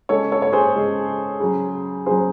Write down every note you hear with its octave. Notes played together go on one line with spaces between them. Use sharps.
C#3 G#3 A4 C#5
A4 C#5
C#5
G#4 C5
C#3 G#3
C#3 F#3
C#3 F#3 G#4 C5